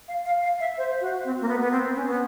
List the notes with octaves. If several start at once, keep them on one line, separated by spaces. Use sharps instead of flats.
F5
F5
F5
E5
C5
F#4
C4
A#3
B3
B3
C4
C#4
B3